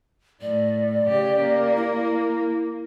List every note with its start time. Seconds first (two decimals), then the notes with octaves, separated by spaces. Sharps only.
0.42 A2 D5
1.05 C#3 G4
1.40 A#3
1.75 E4